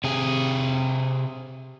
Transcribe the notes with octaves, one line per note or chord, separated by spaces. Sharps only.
C3 G#4